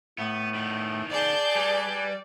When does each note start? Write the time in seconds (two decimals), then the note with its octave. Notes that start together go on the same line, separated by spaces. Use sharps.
0.18 A2 A3 B3
0.54 D#3 B3
1.11 G#4 D5 A5 G6
1.56 G3 B4 G#5